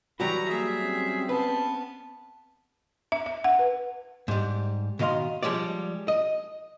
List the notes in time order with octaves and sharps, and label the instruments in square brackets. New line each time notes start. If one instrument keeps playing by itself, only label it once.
[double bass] E3 [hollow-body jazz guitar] F#3 G3 F#4 [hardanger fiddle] A#5 [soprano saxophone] B5
[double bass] A#3 [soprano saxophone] G#4 [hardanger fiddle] E5
[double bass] C4 C#4
[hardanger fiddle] B3 A5 [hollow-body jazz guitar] B4
[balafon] E5
E5
F#5
B4
[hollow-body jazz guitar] G#2 G3
B2 D#3 D#5 F5 C6
F3 G3 G#3 C#5 D5
D#5